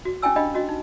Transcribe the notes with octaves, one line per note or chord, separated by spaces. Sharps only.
F#4
C#4 E4 G5 G#5 E6
D4 G4 D#5 F5 G5 B5
C#4 F#4 D#5
D#4